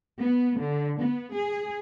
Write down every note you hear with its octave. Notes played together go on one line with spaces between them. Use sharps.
B3
D3
B3
G#4